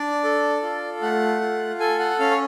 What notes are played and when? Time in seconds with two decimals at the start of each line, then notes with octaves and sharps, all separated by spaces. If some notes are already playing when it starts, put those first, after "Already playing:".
Already playing: D4 D5
0.24 A4
0.63 F4
1.02 A3 F#5
1.41 F4
1.80 A4 G#5
1.99 F#5
2.19 C#4 F5
2.31 C#5